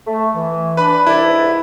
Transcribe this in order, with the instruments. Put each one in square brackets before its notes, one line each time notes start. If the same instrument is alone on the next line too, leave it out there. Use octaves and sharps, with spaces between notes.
[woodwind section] A3
E3
[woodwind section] D4 [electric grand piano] B4 B5
[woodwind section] C2 D5 [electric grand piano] E4
[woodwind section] G#2 B4